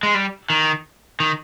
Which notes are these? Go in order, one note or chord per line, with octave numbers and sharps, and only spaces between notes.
G#3
G3
D#3
D#3